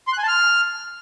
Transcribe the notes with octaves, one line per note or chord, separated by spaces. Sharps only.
C6
F#6
G#5
A5
F6